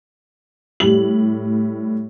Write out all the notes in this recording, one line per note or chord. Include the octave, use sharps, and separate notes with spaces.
A2 G3 F#7